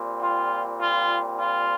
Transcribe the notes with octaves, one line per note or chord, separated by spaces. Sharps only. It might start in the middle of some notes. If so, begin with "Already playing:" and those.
Already playing: A#2 G3 C4
F4
F4
F4